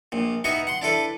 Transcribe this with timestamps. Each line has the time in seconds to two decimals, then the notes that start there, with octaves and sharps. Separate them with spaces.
0.12 A#1 A#2
0.44 B3 D#4 F#4 E5 F#5 G#5
0.67 F#5 C6
0.82 D4 E4 A4 B4